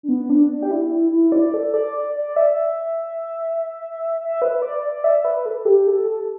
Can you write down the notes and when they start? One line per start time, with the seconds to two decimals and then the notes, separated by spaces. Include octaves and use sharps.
0.03 D4
0.09 B3
0.30 D4
0.50 D4
0.63 G4
0.71 E4
0.91 E4
1.12 E4
1.32 D5
1.54 A4
1.74 D5
1.95 D5
2.15 D5
2.36 E5
4.22 E5
4.42 B4
4.57 B4
4.62 D5
4.83 D5
5.04 E5
5.25 B4
5.46 A4
5.65 G4
5.87 A4
6.07 A4